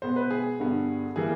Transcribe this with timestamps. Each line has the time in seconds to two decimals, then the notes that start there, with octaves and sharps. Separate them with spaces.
0.02 B2 G#3 B3 C5
0.16 B4
0.31 G#4
0.59 G2 D3 G3 B3
1.16 E3 G3 A#3 G#4